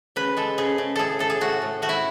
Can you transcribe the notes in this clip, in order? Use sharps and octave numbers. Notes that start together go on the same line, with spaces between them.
C#3 B4
G#3 A4
C#3 G#4
C#3
A2 G#4 A4
A2 A4
G#4
A2 F#4
A2
A3 F#4
E4